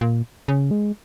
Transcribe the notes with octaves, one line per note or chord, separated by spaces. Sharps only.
A#2
C#3
G#3